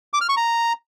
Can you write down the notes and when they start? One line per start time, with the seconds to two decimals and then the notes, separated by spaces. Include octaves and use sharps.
0.13 D6
0.21 F6
0.29 C#6
0.37 A#5